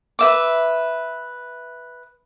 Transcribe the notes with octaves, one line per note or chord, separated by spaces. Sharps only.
B4 E5 D6